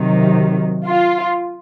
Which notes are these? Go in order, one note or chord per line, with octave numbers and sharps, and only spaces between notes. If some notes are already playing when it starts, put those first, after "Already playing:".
Already playing: C3 D#3 F#3
F4